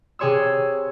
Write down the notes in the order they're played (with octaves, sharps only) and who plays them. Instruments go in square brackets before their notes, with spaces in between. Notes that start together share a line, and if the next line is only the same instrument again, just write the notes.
[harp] C3 G#4 C#5 C6 E6